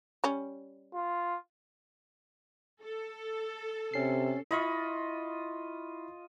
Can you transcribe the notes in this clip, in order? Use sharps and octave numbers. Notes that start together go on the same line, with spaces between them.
G3 C#4
F4
A4
C3 C#4 C7
E4 F4 D#5 B5 C#6